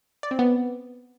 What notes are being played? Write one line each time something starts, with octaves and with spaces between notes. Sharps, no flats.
D5
C4
B3